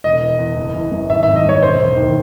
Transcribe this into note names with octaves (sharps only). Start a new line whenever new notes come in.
E1 D#5
E3
E2
F#1
E3
F#2
G#1 E5
G#1 E5
D#5
F#2 C#5
E1 C5
E1
D#2